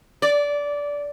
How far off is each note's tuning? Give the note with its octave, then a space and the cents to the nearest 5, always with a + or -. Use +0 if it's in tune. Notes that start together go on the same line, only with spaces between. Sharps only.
D5 -15